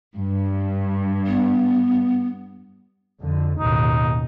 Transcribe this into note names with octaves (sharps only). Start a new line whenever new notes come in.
G2
B3
F2 D3
A1 D#2 B2 D#4